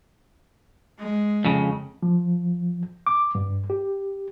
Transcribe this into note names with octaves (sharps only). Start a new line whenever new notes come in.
G#3
F2 C#3
F3
D6
G2
G4